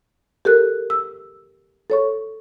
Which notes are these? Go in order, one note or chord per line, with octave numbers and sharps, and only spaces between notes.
G4 A4 A#4 F#6
E6
A4 C#5 C#6